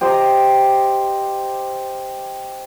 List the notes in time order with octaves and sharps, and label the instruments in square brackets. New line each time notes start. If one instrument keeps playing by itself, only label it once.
[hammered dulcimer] G4 C5 D#5 A#5